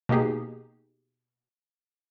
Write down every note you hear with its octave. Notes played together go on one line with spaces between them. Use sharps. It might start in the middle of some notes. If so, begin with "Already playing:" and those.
B2 A#3 D#4 G4 G#4